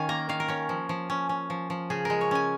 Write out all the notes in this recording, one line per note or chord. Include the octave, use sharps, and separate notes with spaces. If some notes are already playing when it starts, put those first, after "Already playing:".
Already playing: D#3 C#4 F5 G#5
A#3 A#5
D#3 F5
A#4
C#4 C#5
F3
F3
C#4
C#4
F3
F3
C#3 G#4
G#3 A#4
C#5
C#4 G#5